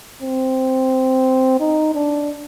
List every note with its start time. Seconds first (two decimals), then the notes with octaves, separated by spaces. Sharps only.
0.22 C4
1.60 D#4
1.95 D4